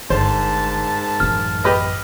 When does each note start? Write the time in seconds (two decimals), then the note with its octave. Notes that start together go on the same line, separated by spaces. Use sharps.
0.10 G1 G#2 A#4 C5 A5
1.20 A1 F#2 F6
1.64 G4 B4 D#5